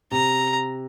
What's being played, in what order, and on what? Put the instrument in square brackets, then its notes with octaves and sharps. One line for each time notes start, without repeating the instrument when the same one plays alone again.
[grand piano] C3 [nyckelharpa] A#5